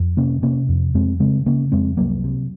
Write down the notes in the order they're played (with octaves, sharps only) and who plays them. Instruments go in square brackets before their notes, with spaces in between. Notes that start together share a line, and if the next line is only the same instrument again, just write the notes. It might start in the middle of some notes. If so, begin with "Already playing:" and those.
Already playing: [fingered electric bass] F2
C3 A#3 C#4
C3 A#3 C#4
F2
F2 G#3 C4
C#3 G#3 C4
C#3 A#3 C#4
F2 G#3 C4
C2 F#3 A#3
C3